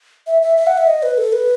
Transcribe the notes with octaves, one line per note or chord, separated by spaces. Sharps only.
E5
E5
E5
F#5
E5
D#5
B4
A4
B4